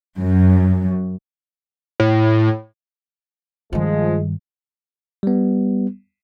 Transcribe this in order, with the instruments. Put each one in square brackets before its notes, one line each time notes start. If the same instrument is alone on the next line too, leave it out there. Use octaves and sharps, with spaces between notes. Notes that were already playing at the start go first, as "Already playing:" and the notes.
[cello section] F#2
[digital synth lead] A2
[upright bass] G2 D#3 [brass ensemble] F3 G#3
[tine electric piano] G3 B3